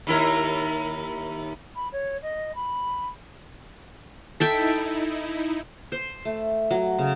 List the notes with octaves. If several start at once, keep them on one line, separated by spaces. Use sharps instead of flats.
D#2 E4 A#4
B5
C#5
D#5
B5
D#4 E4 A4 E5 G5
C5
A3
F#3
C#3